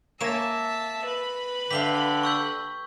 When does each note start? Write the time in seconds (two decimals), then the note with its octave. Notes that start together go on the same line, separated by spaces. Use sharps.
0.21 A#3 C#5 E5 G#5 A5 A#6 E7
1.05 B4 B5
1.71 D3 G4 E5 F5 B6 G7
2.23 C#6 E6 G6